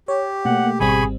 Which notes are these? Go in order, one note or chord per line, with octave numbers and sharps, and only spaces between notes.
G4 C#5
B2 A3 A#3 F#5
G#1 B2 G3 C4 G#4 G#5 B5 C#6